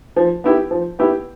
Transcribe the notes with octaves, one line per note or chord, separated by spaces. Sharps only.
F3
B3 E4 G4
F3
B3 E4 G4